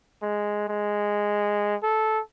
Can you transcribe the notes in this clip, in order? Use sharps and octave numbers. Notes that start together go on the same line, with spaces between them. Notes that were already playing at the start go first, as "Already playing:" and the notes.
G#3
G#3
A4